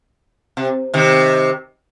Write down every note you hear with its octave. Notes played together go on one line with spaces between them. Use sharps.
C3
C3 D#3